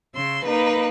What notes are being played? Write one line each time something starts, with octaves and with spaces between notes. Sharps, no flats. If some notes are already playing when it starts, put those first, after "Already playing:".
C#3 C6 E6
A#3 D#4 B4